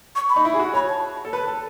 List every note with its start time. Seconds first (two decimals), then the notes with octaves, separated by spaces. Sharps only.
0.15 C#6
0.30 B5
0.36 D#4
0.45 E4
0.54 G#4
0.60 F#4
0.74 C#5 B5
0.89 A5
1.25 A4
1.33 B4 A5
1.48 A4